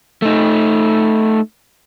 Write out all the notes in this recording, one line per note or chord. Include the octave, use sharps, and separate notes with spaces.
A3 D#4